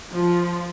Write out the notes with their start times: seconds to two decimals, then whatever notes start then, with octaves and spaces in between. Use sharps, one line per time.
0.12 F3